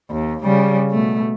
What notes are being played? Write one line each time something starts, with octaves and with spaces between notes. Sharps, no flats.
D#2
C#3 G3
B2 A3